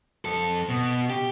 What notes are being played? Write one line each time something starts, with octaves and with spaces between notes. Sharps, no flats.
F2 A4
B2
G4